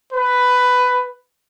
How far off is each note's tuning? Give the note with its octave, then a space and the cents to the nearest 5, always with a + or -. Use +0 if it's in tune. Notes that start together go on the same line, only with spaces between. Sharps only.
B4 +10